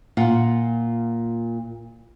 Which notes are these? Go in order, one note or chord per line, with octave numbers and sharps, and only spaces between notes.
A#2 F4 F#5